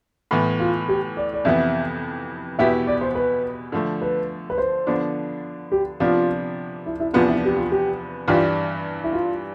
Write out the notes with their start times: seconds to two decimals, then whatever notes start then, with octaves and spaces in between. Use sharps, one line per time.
0.31 A2 E3 B3
0.60 F4
0.89 G4
1.17 D5
1.34 D5
1.45 F2 C3 E3 B3 E5
2.59 E2 B2 B3 E4 G4 E5
2.87 D5
3.01 C5
3.15 B4
3.72 D3 F3 A3
4.02 B4
4.50 B4
4.58 C5
4.87 D3 F3 B3 D4
5.72 G4
6.00 C3 F3 B3 D4 F4
6.86 E4
7.00 E4
7.14 E2 C3 F3 B3 D4 F4
7.28 E4
7.45 G4
7.56 F4
7.72 G4
8.28 G2 E3 G3 D4 F4 G4
9.04 E4
9.13 F4